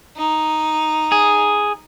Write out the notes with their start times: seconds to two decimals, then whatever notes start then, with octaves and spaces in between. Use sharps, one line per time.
0.17 D#4
1.12 G#4